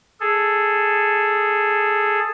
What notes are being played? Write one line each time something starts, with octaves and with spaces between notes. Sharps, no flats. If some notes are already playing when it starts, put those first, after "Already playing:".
G#4 A4